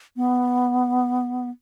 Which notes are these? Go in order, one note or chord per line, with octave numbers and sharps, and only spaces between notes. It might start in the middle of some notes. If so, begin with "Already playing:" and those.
B3